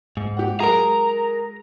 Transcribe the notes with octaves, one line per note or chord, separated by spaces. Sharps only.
G#2
G4 F#5
F#3 G#3 G#4 A#4 A#5